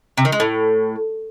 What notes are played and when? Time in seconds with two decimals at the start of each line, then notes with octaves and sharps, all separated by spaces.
0.18 C3
0.25 D#3
0.32 G#3
0.40 A2